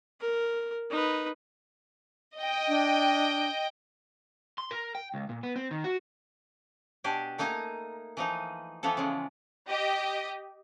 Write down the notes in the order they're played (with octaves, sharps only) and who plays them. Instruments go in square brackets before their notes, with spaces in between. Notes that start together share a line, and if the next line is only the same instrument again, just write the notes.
[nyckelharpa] A#4
D#4 B4
[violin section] D#5 G5
[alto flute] D4
[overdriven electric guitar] C6
A#4
G5
C#2
A#2
B3
C4
D#3
F#4
[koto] B2 D4 G4 G#5
A3 A#3 D#4 G#5 A#5
E3 F3 D#4
E3 F3 B3 F4 A4
C#3 G#3
[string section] G4 D#5